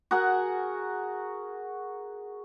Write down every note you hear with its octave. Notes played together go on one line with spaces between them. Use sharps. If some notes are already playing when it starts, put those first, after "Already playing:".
F#4 G#4 A#4 F#5